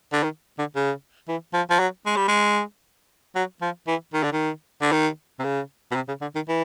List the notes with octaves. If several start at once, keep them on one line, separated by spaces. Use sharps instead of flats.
D3
D#3
D3
C#3
E3
F3
F3
F#3
G#3
G3
G#3
F#3
F3
E3
D#3
D3
D#3
D3
D#3
C3
C#3
B2
C3
C#3
D3
D#3
E3